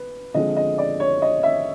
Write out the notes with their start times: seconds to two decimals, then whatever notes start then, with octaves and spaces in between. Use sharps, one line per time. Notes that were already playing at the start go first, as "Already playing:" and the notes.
Already playing: B4
0.34 D3 F3 G#3 C4 D#5
0.56 D#5
0.78 D5
1.00 C#5
1.22 D#5
1.43 E5